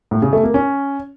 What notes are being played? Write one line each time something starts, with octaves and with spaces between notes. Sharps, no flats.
A2
C#3
A3
A#3
C#4